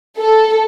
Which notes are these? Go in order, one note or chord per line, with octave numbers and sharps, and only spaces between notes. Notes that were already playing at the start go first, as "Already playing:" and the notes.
A4